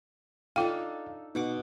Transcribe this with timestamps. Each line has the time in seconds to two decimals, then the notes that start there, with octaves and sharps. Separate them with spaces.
0.56 D4 D#4 F4 A4 F5 G5
1.35 B2 D#4 F#5 D6